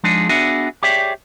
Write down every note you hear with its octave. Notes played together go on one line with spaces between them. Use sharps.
F3 G#3 D4 D#4 G#4
B3 D4 F#4 G#4 E5
G4 G#4 C#5 D5 E5 G5